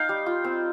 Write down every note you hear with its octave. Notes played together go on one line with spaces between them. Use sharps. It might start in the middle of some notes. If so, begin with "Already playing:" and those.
Already playing: D#4 F5 G5
G3
F4
C4